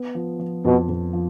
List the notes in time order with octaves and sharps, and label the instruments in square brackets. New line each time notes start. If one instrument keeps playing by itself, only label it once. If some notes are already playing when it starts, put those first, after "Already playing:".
Already playing: [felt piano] B3
F3
F3
[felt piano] F2 [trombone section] B2
[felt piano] F2
F3